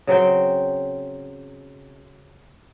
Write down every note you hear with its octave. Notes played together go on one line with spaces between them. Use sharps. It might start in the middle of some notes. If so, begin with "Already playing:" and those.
C#3 F#3 C4 G5